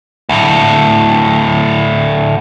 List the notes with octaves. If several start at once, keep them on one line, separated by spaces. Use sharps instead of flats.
D2 A2